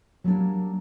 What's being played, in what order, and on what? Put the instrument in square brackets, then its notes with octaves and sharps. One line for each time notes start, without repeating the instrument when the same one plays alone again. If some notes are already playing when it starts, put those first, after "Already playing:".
[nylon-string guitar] F#3 G3 A#3 C4 D4 C#5